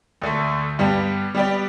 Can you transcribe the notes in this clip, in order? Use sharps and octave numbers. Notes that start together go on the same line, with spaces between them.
D2 D3 A3
G2 G3 B3 G4
G3 B3 G4 B4 D5